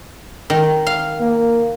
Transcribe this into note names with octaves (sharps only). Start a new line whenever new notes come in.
D#3
F5
A#3